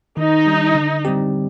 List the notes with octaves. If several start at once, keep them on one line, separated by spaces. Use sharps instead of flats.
D#3 D#4
G3 D4
D3
G3 C4 G4